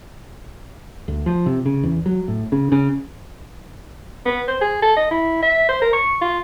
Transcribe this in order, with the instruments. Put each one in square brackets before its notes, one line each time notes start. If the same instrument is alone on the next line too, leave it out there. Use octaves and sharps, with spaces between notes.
[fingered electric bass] D2
F3
C3
C#3
E2
F#3
A2
C#3
C#3
[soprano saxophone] B3
C5
G#4
A4
D#5
E4
E5
C5
A#4
C#6
F4